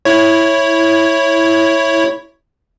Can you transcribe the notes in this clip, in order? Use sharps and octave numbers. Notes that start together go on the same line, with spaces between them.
E4 C#5